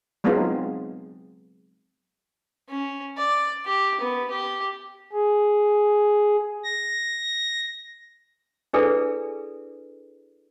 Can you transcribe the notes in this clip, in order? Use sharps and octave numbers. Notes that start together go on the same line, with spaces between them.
F#3 G#3 B3 C4 D#4 F4
C#4
D5
G4
B3
G4
G#4
A#6
D4 E4 G#4 A4 B4 D5